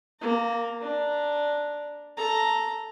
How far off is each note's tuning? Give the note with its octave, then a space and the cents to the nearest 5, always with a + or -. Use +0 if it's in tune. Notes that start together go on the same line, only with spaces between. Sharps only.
A#3 +0 A#5 -40
D4 +0 A#5 +0
A4 +0 A#5 +0